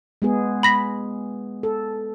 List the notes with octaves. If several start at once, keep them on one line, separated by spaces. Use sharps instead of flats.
G#3 B3 G#4
B5 A#6 B6
A4